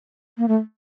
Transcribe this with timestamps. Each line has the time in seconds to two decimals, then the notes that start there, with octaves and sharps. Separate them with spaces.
0.38 A#3
0.48 A3